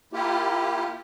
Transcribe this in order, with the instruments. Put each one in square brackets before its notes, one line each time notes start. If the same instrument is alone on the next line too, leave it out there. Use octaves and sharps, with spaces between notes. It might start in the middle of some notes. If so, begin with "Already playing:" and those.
[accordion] A#3 E4 F4 G4